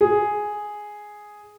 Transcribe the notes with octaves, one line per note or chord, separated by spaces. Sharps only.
G#4